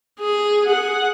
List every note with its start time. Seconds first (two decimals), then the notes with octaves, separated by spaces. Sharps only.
0.19 G#4
0.66 G#4 F#5